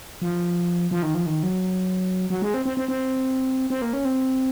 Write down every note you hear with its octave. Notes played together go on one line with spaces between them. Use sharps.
F3
F3
D#3
F3
D#3
F#3
F#3
G#3
C4
C4
C4
C4
C4
A#3
C#4
C4